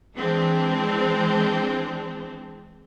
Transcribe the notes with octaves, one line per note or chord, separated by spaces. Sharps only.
E3 G#3 C4 D4